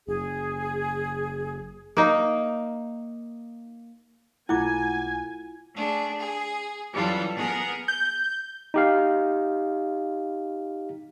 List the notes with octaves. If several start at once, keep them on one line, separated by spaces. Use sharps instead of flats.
F#1 G#4
A#3 D#4
B1 A3 E4 F4 F#5 G#5 D6
A3 D4 G#4
G#4
F#2 E3 G3 F4 A4
B3 G#4 A#4
G6
D#4 G4 F5